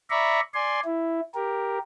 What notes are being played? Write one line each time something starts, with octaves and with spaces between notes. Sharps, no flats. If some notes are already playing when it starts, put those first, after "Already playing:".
D5 E5 A#5 B5 C#6
D5 G#5 C6
E4
G4 A#4